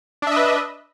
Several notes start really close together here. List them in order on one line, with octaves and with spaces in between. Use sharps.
D4 E5 D#5 B4